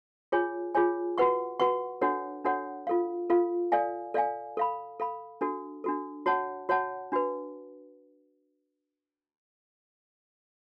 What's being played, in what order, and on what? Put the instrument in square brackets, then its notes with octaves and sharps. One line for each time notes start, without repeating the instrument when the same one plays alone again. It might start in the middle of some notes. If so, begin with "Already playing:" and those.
[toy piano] F4 G#4 C#5 G#5
F4 G#4 C#5 G#5
F#4 B4 F#5 C#6
F#4 B4 F#5 C#6
D4 F#4 A4 C#5 F#5
D4 F#4 A4 C#5 F#5
F4 A4 F5
F4 A4 F5
A4 D5 F5 G#5
A4 D5 F5 G#5
A4 F5 B5
A4 F5 B5
D4 F#4 A4
D4 F#4 A4
F#4 C#5 F#5 A5
F#4 C#5 F#5 A5
D4 F#4 B4